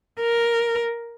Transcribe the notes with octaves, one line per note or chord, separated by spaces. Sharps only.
A#4